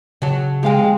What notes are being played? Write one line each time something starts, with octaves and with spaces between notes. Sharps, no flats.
C#3 F#3 F#4 C#5 A5
G#3 C4 G4 C5 F5 G5